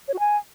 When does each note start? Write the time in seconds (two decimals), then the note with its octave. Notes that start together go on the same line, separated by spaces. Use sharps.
0.08 C#5
0.14 F#4
0.19 G#5